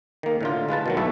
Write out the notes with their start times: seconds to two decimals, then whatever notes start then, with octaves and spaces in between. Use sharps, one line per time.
0.23 D#3 A#3
0.41 A2 D3 F4
0.69 G#3 F4 B4 A5
0.86 B2 D#3 F#3
0.97 B1 A3 E4 E5